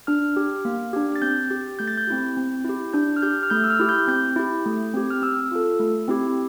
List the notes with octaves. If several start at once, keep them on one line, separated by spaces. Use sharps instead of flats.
D4 F6
G4
A#3
D4 G4
A6
C4 G6
G4 A6
A3 G6
A6
G6
C4 E4 G4
C4
E4 G4
D4 G6
F6
G4 G6
F6
A3 G6
E6
F6
E4 G4
G6
C4 G6
E4 G4
A3
C4 G4
F6
C4 E6
F4 A4
A3
C4 E4 G4